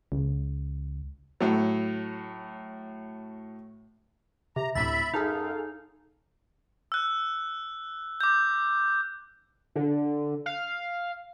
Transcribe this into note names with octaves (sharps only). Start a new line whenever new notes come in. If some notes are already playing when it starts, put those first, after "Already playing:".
C#2
A2 F#3
C3 A#5
D2 A2 C3 E5 B5 A6
F#2 D#4 G#4 A4 F5
E6 F#6
D6 G6
D3
F5